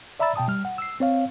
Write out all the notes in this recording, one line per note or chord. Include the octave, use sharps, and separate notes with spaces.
D5 E5 A#5 B5 E6 A6
B2 G5 A5 D#6
G3 F6
F#5
E6 C7
C4 C#5 F5